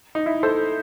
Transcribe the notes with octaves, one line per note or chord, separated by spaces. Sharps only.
D#4
E4
A4 C5